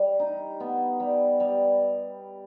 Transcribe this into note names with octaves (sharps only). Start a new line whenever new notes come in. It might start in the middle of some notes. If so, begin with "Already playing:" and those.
Already playing: G3
D#4
B3
G3
G3